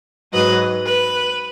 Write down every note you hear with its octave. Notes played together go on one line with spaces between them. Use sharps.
G#2 F#3 B4 D#5
B4